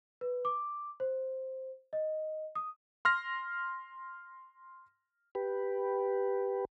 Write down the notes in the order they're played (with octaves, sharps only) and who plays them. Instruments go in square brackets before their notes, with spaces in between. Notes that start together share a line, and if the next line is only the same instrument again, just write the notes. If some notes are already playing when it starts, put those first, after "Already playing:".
[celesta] B4
D6
C5
D#5
D#6
[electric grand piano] C6 F6 A#6
[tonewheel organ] G4 B4